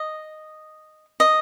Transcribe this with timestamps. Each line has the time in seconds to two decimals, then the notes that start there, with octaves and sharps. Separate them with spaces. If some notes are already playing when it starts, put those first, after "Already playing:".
Already playing: D#5
1.20 D#5